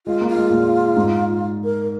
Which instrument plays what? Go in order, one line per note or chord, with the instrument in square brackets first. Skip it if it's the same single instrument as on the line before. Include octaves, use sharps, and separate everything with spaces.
[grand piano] G#3 [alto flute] F4
[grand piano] A#3
[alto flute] F4
[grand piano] G#3
A#2
G#2
[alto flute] A#4